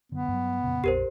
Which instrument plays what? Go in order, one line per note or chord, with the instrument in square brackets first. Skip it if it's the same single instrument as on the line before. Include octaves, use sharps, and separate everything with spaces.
[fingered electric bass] F#2 D3 [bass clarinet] B3
[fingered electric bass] G2 F#3
F2 A#2 C#3
[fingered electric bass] A#1 F2 [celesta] G4 A#4 C5